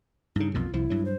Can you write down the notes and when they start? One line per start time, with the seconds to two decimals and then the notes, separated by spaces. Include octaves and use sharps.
0.36 G2 C#3 D#4
0.54 B1 F2 A#2 F4
0.74 C2 F3 E4
0.90 G2 F#3
1.05 C5